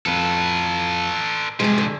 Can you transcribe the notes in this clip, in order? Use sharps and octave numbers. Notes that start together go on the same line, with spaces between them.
F2 A4 B4
C3 F3 G#3 G#4
D3